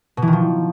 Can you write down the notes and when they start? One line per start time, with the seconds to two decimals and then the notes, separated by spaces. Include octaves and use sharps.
0.17 B2
0.22 E3
0.27 D#3
0.33 F3